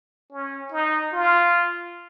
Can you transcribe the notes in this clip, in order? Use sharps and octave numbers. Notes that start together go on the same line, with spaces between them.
C#4
D#4
F4